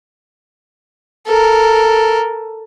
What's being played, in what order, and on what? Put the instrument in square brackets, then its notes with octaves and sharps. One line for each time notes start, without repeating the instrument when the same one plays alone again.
[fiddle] A4 A#4